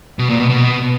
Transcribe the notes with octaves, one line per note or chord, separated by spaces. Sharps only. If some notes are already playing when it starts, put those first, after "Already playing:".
B2
A#2
B2
B2